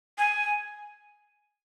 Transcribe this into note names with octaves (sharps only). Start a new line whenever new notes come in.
G#5